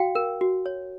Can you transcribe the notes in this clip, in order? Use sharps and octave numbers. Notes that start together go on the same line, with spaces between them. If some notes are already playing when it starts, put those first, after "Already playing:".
Already playing: F#4 F5 G5
A#4
F#4
C#5